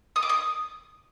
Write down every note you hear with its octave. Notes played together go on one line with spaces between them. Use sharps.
D#6
D6
D#6